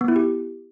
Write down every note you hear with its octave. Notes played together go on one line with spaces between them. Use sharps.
B3
E4
G4